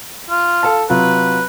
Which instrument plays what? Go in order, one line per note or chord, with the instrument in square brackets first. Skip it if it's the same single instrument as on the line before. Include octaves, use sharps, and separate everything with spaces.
[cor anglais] F4
[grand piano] A4 F5 A5
[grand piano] C3 F#3 F4 [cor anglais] B4